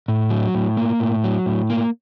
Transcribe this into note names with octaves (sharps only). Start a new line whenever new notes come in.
A2
F#3
A2
A#3
A2
F#3
A2
A#3